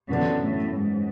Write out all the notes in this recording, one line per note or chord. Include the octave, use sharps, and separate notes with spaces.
F#2 D3 E3 B3
A2
G#2